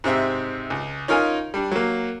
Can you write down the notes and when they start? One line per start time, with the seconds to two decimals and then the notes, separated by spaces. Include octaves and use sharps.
0.04 G#2 C3 C4 E5
0.70 C#2
1.08 C#4 D#4 F4 A#4 F5 G#5
1.54 G3 D4
1.72 F#3 A#3